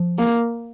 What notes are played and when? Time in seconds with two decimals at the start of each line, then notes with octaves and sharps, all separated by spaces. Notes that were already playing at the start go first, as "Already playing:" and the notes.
Already playing: F3
0.18 A#3